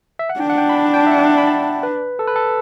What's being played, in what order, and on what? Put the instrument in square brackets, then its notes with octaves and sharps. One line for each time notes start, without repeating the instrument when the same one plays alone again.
[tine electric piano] E5
F#5
[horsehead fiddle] D4 [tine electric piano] G5
[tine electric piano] F#5
G5
B5
A5
G5
E5
F#5
B5
A5
B4
A4
B4
A4